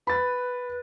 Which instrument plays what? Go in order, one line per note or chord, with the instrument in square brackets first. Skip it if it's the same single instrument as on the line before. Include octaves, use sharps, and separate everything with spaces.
[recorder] B4 [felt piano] B5 A6